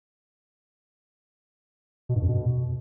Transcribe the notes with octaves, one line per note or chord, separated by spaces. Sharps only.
B2
G2
F2
B2